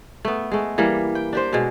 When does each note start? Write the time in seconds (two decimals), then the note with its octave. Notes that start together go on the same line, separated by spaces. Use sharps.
0.25 A3 B3
0.52 G#3 A3
0.78 E3 G3 A#3
1.15 G5
1.33 D4 G4 C5
1.53 B2 G#3